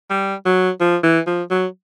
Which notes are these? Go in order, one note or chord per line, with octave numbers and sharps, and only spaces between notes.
G3
F#3
F3
E3
F3
F#3